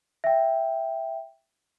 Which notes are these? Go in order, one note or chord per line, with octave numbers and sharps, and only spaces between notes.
E5 G5